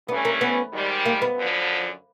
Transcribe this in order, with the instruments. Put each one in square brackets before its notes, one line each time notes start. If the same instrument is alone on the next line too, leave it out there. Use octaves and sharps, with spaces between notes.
[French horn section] G2 E3 A3 C#4 [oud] B3
[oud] A#3
B3
[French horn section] G#2 D#3 G3
[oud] A#3
B3
[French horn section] F#2 D3 F3